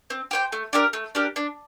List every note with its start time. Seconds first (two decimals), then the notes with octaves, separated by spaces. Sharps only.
0.10 C4
0.31 G4 C5 G5
0.52 A3
0.73 D4 G4 A#4
0.93 A3
1.15 D4 G4 A#4
1.36 D4